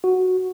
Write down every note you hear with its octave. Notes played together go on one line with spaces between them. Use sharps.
F#4